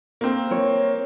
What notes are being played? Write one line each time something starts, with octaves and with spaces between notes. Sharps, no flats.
A#3 C4
C#5